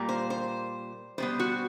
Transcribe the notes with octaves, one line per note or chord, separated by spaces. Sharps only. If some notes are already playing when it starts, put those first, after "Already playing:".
Already playing: A#2 G3 A#3
C5
C5
B2 G3 B3 C5
F#4